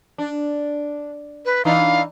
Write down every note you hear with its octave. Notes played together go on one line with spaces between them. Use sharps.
D4
B4
E3 D4 D#4 F5